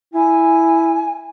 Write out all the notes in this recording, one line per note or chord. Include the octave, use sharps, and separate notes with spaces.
E4 G#5